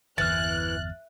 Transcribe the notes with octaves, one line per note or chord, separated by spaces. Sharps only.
G1 E2 E3 F6 F#6 A6